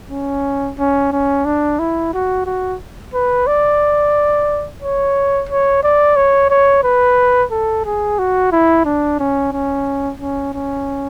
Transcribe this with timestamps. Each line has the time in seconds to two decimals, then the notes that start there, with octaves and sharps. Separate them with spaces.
0.11 C#4
0.79 C#4
1.12 C#4
1.45 D4
1.79 E4
2.14 F#4
2.46 F#4
3.14 B4
3.47 D5
4.82 C#5
5.49 C#5
5.84 D5
6.16 C#5
6.50 C#5
6.84 B4
7.51 A4
7.85 G#4
8.19 F#4
8.52 E4
8.85 D4
9.19 C#4
9.52 C#4
10.20 C#4
10.54 C#4